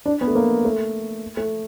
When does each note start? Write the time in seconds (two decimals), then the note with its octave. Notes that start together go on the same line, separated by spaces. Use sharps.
0.06 D4
0.21 B3
0.28 A3
0.35 A#3
0.65 A3
1.37 A3